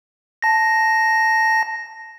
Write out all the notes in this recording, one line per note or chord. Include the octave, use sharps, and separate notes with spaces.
A5 A#6